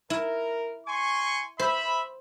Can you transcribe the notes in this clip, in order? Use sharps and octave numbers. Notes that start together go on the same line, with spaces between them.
E4 A#4
G#5 C6 C#6
C5 E5 B5